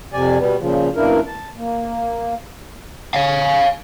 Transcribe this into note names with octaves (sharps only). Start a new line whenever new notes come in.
F2 C3 D5 G#5
B2 G3 B3
A#2 C#3 F3
F#2 B2 A#3 D4 E4 A#4
A5
A#3
C#5 F5